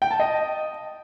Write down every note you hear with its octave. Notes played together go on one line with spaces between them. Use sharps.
G5
A5
D#5